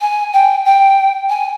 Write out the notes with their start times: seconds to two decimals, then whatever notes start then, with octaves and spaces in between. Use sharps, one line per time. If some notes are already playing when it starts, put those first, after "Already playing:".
0.01 G#5
0.33 G5
0.65 G5
1.29 G#5